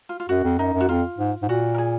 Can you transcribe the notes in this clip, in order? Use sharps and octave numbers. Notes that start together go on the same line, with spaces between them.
F4
F4
F#2 F#4
F2
F#2 D#4
F#2
F#4
F2 F4
G#2
G#2
A#2 F#4
A#4
G#4